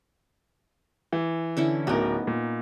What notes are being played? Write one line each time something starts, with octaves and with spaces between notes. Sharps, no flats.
E3
D3 C#4 E4
D1 B3 D#4 A#4
A#2